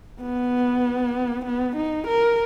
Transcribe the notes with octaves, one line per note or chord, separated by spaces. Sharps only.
B3
B3
D#4
A#4